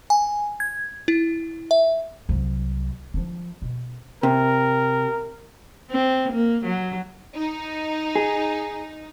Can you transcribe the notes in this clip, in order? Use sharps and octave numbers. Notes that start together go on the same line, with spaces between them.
G#5
G#6
E4
E5
C2 F#3
F3 D4
B2
C3 A#4
C4
A#3
F#3
D#4
G#4